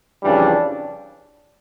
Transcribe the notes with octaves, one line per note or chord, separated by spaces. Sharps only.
F2 C#3 E3 G3 D4